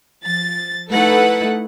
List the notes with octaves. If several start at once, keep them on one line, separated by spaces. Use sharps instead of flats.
F3 A6
A3 D#4 E4 A4 B4 F#5